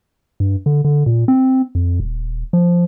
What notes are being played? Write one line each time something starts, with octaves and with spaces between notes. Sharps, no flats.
G2
D3
D3
A#2
C4
F2
D#1
F3